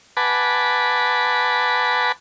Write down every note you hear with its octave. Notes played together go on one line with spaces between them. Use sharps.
B4 F#5 G#5 A5 B5 D6